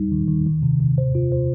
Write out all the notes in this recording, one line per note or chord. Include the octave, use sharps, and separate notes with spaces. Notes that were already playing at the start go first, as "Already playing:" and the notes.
Already playing: G3 D#4
D#3
D#3
D#3
C3
C3
C5
F4
C5